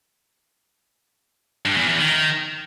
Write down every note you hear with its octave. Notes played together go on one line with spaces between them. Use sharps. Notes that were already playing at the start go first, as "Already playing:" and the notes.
G2
E2
E2
D#3